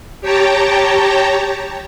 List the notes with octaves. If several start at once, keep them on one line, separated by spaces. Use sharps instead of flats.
G4 C#5 G5 A5 A#5